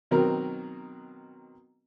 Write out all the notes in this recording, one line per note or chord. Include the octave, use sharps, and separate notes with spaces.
B2 D#3 F#3 C4 A#4